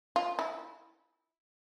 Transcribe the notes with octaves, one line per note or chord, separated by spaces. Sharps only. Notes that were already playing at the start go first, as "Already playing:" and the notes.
F4
E4